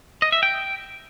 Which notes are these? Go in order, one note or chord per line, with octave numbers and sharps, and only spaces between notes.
D#5
E5
G5